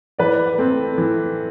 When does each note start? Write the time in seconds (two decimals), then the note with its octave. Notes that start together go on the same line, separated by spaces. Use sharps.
0.19 E3 B4 D5
0.58 A3 C4
0.98 E3